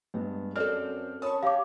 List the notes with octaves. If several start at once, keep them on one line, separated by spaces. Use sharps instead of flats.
G2 G#3 B3
F#2 C4 A4 D5 F6
C#4 A5 B5 C#6 D#6
G4 C#5 F5 D6